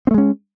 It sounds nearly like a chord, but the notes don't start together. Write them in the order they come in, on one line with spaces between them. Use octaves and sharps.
C4 A3 G#3 C#4